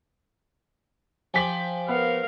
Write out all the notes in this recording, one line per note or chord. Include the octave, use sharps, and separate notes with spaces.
F3 G4 G#5 B6 F#7
B3 A#4 F5 F#5